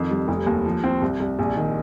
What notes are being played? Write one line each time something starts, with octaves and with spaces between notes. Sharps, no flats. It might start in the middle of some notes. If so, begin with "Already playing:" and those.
Already playing: F2 D#3
G3
F1
D#2
F3
C4
C2
C2
A#1
D#3